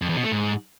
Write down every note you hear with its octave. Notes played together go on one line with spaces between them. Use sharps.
F2
E2
B2
A3
G#2